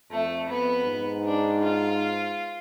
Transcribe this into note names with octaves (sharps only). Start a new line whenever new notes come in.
F2 A3
F2 B3
G#2
D4
F4